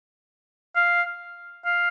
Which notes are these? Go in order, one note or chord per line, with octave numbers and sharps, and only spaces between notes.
F5
F5